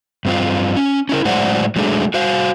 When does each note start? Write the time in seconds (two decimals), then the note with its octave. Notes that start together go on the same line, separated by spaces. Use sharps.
0.25 G2 C4 F4
0.77 C#4
1.09 C#4 E4 A#4
1.25 A2 F#3 G#3 C5 D5 F#5
1.76 F#3 G#3 A3 D4 G#4
2.14 F#4 C5 F5